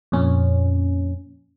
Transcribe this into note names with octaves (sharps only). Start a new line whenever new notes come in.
F2 A#2 C#4